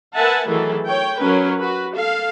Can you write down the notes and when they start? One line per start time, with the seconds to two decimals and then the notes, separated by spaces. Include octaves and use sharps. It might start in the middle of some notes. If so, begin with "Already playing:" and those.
0.15 A#4 B4 E5 F#5 G#5 A5
0.48 D#3 E3 F#3 A3 G#4 A4
0.86 C#5 G5
1.19 F#3 C#4 A#4 B4
1.60 F#4 B4
1.94 A4 F5